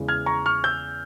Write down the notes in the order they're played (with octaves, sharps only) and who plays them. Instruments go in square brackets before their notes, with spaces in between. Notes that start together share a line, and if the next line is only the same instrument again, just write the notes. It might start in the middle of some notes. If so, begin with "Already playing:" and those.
Already playing: [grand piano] E2 C#3 E3 G#3
F6 G#6
A#5 C#6
C#6 F6
E6 G6